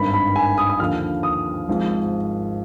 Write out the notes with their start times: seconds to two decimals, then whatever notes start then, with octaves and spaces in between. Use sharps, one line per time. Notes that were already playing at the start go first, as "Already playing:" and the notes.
Already playing: G#1 G2 D#3 B5
0.14 B5
0.36 G#5
0.58 D#6
0.70 D#6
0.80 D#2 D3 F3 F6
1.23 D#6
1.68 G#1 G#2 F3